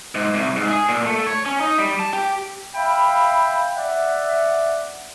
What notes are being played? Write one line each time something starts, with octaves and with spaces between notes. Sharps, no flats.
G#2
C2
G#2
G#4
A#2
A3
C#5
C#4
D#4
G3
A5
G4
E5 F5 G5 B5
D5 E5 F#5